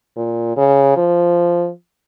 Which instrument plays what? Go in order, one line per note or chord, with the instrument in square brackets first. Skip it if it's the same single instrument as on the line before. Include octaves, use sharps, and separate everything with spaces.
[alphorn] A#2
C#3
F3